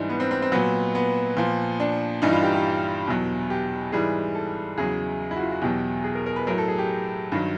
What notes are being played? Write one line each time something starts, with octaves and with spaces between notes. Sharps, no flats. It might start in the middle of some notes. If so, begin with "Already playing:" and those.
Already playing: G#2 E3 G3 D4
B3
C4
C4
C4
A#2 F#3 B3
B3
A#2 F3
D4
G2 E3 G3 D#4
F4
G4
G4
E2 B2 F#3
G4
G#2 E3 G3 G#4
A4
E2 C#3 F#3 G#4
E4
F#4
F4
F#4
E2 B2 F#3 G4
G#4
A#4
A#4
B4
A2 F#3 A#4
A4
G#4
G4
G2 D#3 F#3